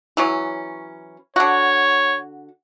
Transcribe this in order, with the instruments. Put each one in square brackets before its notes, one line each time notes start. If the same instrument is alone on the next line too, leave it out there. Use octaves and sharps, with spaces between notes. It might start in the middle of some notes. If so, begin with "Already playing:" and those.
[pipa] E3 F#3 C#4
[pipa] D3 F#4 [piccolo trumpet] C#5